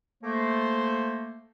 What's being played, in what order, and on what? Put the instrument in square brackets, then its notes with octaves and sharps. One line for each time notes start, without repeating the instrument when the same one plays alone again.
[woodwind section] A3 A#3 [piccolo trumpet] C5